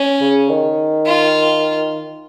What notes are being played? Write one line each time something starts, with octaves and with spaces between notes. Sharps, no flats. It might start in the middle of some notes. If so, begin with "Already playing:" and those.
Already playing: C#4
C#3
D#3
F4